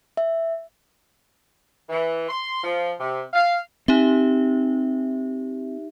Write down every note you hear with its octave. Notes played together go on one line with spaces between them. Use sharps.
E5
E3
C6
F3
C3
F5
C4 D#4 G4 E5